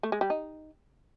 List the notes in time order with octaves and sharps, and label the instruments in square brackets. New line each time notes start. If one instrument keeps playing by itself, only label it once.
[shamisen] A3
G#3
G3
D#4